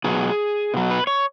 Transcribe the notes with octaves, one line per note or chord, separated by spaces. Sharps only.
B2 F#3 G#4
B2 F#3
B4
C#5